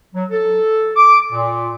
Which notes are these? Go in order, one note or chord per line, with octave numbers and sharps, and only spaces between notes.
F#3
A4
D6
A#2